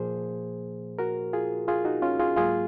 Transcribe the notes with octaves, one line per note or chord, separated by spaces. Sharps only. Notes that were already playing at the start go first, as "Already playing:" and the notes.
Already playing: A#2 F3 A#3 G#4 C5
F#4 A#4
F4 G#4
F4 G#4
D#4 F#4
C#4 F4
F4 G#4
G#2 F#3 A#3 F4 G#4